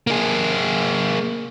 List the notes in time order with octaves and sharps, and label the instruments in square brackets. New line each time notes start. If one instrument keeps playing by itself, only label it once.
[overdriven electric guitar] A#3 G#4